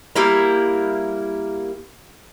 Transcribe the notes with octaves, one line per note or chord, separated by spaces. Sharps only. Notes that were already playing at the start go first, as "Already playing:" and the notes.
G3 A#3 E4 A#4